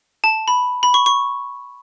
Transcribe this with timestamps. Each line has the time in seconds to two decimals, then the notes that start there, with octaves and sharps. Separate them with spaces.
0.24 A5
0.48 B5
0.83 B5
0.94 C#6
1.06 C#6